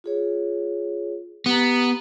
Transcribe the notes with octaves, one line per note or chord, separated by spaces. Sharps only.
F4 G#4 C#5
B3 G4 A#5